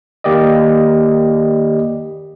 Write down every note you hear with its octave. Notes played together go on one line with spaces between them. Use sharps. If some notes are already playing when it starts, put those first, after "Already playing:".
D#3 A#3 G4 D5 D#5